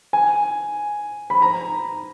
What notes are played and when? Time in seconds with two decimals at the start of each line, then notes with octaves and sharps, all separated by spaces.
0.13 G#5
1.30 B5
1.42 A#5